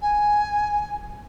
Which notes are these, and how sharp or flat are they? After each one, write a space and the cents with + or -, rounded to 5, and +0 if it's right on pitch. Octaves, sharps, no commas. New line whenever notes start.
G#5 +5